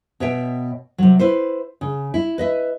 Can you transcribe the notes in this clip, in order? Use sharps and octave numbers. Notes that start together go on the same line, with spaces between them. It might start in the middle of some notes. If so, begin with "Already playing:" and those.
B2 C#5 E5 G5
C3 F#3
E4 B4 C5
C#3
E4
B4 D#5 E5